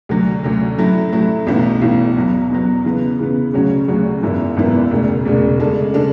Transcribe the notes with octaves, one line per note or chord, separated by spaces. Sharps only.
D2 D3 F#3
D2 D3 F#3
A2 F#3 A3 E4
A2 F#3 A3 E4
B1 A2 E3
B1 A2 E3
E2 B2 F#3
E2 B2 F#3
C#3 E3 B3
C#3 E3 B3
D2 C#3 F#3 C#4 F#4
D2 C#3 F#3 C#4 F#4
G#1 F#2 E3 B3 E4
G#1 F#2 E3 B3 E4
E1 D2 C#3
E1 D2 C#3
C#3 G#3 D4 A4
C#3 G#3 D4 A4